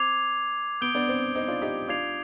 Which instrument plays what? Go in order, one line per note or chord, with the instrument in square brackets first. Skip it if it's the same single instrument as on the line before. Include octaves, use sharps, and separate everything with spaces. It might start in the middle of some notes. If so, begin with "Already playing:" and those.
Already playing: [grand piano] C4 [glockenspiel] D6 G#6 C7 F7
[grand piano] B3 [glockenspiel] D#6 G6 D7 G7
[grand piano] B3 D4
C4
C4 D#4
D4 F4
D#4 G4
[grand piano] D4 F4 [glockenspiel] D6 G#6 C7 F7